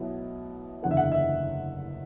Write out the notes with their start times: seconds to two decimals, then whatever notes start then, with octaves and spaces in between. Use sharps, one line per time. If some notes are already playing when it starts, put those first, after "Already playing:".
Already playing: B1 B2 B3 E4
0.83 F#1 E2 D3 B3 F#5
0.91 E5
0.97 F#5
1.12 E5